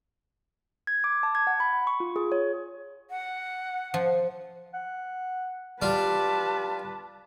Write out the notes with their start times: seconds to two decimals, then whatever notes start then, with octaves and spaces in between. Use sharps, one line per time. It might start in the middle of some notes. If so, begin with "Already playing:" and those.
0.87 G#6
1.04 D6
1.23 A5
1.35 G#6
1.47 F#5
1.60 B5
1.87 C#6
2.00 F4
2.16 G#4
2.32 C#5
3.10 F#5
3.94 F3
4.74 F#5
5.82 G3 F4 G4 B4 A5